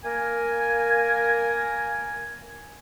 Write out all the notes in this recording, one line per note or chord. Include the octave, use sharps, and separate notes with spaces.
A#3 A#4 G#5